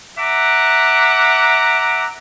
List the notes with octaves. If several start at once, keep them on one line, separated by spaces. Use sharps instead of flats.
E5 F#5 A#5 D6